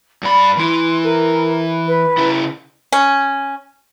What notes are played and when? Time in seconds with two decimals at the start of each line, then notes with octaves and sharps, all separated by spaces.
0.23 G2 D5 B5
0.57 E3 E4 C6
1.04 A#4
1.87 B4
2.18 C#3 E4
2.92 C#4